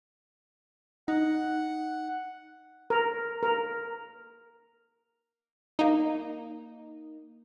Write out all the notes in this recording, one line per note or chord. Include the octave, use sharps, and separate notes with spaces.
D#4 F#5
A#4
A#4
A#3 D#4